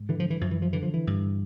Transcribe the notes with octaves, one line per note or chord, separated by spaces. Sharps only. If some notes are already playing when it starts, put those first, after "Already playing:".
Already playing: G#2
D3 E3
F3
E3
F#2 F3
E3
F3
D3 E3
F3
E3
G2